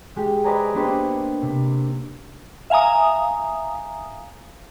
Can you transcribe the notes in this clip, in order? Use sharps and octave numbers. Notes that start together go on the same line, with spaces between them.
G#3 G4
B4 C5 D5 D#5 G#5 A#5
A#3 B3 D4 G4 B4 C5
C3
E5 F5 G#5 A#5 D#6